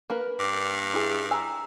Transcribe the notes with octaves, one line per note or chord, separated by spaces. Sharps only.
A#3 A#4 B4
G2 D6
E4 G#4
G#5 A#5 E6